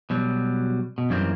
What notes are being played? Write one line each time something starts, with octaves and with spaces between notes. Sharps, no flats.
B2 F#3 G3
B2
F#2 D#3 E3 G3 A#3 C4